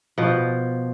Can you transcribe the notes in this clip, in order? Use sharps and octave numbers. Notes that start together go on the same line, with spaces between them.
B2 F3